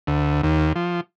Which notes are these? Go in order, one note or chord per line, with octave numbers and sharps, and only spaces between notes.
D2
D#2
F3